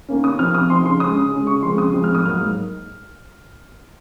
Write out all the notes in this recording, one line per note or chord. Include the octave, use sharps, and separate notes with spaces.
D#3 A#3 C#4
C3 D#6
F3 C4 D#4 F6
C3 D#6
F3 C4 D#4 C6
C#3 C6
G#3 C#4 D#6
C#3
G#3 C#4
C#3 C#6
F3 G#3 C4 C6
C#3 D#6
F3 G#3 C4
F6
G#2
D#6
F#3 A#3 F6
G#2